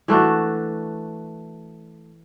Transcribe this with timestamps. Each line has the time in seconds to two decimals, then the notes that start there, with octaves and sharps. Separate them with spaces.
0.08 E3 A3 D4 F#4